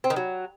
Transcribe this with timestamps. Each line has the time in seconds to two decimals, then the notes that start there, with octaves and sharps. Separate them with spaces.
0.04 C4
0.10 D#3
0.16 F#3